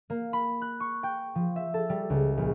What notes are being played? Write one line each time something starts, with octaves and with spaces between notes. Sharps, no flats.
A#3
B5
F#6
C#6
G5
F3
E5
A4
G3
C#2
A#1